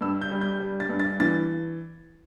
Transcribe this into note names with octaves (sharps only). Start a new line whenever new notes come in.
G2 E6
G6
G3
G6
G3
A6
G2
A6
E3 A6